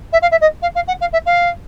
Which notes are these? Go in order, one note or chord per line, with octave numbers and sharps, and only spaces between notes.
E5
F5
E5
D#5
F5
F5
F#5
F5
E5
F5